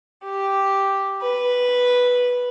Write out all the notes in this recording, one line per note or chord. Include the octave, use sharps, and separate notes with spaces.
G4
B4